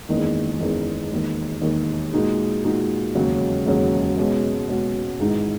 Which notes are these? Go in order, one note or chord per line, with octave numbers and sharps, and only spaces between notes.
F#1 E2 D#3 G#3
F#1 E2 D#3 G#3
E1 D#2 D#3
E1 D#2 D#3
A#2 G#3 D#4 F#4
A#2 G#3 D#4 F#4
E1 D#2 C#3 F#3 C#4
E1 D#2 C#3 F#3 C#4
B2 G#3 C#4 F#4
B2 G#3 C#4 F#4
G#1 G#2 E3 G#3 D#4